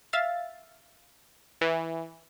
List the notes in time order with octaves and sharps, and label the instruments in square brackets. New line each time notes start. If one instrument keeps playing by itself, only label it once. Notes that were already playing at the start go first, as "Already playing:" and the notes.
[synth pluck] E5 F5 A6
[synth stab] E3